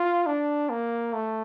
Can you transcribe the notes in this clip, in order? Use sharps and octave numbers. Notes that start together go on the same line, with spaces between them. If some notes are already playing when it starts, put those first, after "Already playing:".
Already playing: F4
D4
A#3
A3